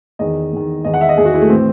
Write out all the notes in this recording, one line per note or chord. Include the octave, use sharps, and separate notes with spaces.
E2 D#3 D#5
E2 D#3
E2 D#3 D#5
F#5
E5
D#5
E2 D#3 G#4
F#4
E4
A3
A2 E3 C4